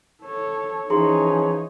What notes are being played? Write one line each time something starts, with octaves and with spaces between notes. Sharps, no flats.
A4 C#5
E3 F3 C#4 D#4 G#4 C#5 A#5 C6